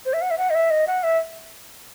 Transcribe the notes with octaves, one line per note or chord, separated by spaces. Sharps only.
C5
E5
F#5
E5
F#5
D#5
E5
D#5
F#5
E5